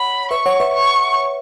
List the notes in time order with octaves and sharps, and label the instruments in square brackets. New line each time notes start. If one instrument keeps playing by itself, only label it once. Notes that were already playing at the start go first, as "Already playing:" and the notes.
Already playing: [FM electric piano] C#5 F#5 [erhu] B5
[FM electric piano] B4 E5 [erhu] C#6
[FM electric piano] C#5 F#5
B4 E5
[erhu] C#6